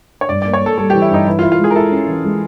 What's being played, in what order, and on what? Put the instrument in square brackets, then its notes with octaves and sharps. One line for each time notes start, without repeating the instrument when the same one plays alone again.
[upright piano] C#5
[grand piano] G2 [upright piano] D5
[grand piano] A#3 [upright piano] D5
[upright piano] C#5
[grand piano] A#3 [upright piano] A4
[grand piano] G3 [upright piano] A4
[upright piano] G4
[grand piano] E3
[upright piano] E4
[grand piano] G2 [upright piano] D#4
[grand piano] E3 [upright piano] E4
[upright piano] F4
[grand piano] E4
[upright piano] F4
[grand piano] G#3
[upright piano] G#4
A#4
[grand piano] E4 [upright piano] A4
[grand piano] C#4
E3
G#3